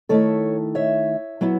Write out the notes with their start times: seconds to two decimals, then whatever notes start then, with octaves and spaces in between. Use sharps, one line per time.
0.09 D#3 A3 E4 A4 C#5
0.75 C#5 E5
1.41 F#3 B3 E4